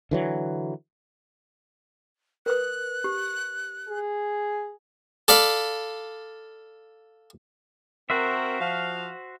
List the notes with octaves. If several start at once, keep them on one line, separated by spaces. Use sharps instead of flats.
D3 E3 F#3
A#4 B4 D#6 F#6
G4
G#4
A4 D5 F5 B5
C4 F#4 A#4 C5 E5
F3 F5